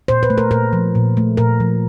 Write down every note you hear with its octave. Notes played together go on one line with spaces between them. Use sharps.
A#2 C5
B4
A3
A#4
A#2 A#4
F3
A#2
A3
A#2 A#4
F3